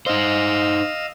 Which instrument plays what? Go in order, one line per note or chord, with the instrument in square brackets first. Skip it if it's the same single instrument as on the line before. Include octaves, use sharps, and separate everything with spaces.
[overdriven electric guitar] D#4 C5 [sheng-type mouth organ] D#5 F5 E6